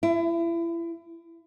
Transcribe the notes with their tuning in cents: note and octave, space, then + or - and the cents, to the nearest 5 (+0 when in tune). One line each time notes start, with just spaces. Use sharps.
E4 +30